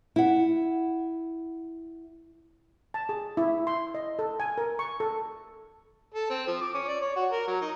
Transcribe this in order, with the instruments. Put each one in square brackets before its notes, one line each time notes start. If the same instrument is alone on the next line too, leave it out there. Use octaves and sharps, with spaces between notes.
[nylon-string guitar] E4 F#5
[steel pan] A5
G#4
E4
C6
D#5
A4
G#5
A#4
C#6
A4
[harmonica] A4
C4
F3
D6
C#4
D5
C#5
F#4
A#4
F#3
D#4